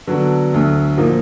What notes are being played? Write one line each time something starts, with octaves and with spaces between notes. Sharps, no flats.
D3 F#3 B3 D4 F#4
D2 D3 F#3
A#2 F3 A#3 D#4